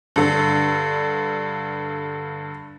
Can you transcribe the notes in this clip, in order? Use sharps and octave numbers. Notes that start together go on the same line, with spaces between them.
G2 D3